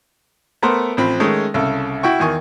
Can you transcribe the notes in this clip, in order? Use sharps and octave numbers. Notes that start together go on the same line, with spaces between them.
A3 B3 A#4 C5
A1 F3 C4 B5
D#3 G#3 A3 C#4 D#4
C2 C#3 A4
E4 F#4 G5 C#6
E2 D#3 G#5 C#6